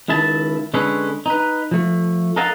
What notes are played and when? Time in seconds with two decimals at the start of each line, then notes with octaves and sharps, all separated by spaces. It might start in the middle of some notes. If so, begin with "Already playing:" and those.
0.08 C#2 D#3 E4 E5 A5
0.74 D3 G#3 C#4 G#4 A4 B4
1.26 D#4 B4
1.71 F3 A3
2.36 A4 A#4 D#5 F5 F#5 A5